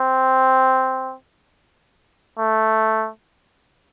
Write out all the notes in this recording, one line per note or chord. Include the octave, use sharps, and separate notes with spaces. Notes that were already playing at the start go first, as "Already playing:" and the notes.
Already playing: C4
A3